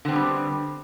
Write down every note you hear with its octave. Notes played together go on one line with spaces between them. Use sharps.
D3 G3 B3 C4